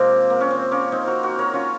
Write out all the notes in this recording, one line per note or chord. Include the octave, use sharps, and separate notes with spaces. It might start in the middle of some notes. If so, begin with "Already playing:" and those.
Already playing: C3 F3 G#3 A#3 C4
A#3
C#4
C4
A#3 C#4
C4 D#4
F#4 A#4
F#4 A#4
A#4 C#5
C#4 F4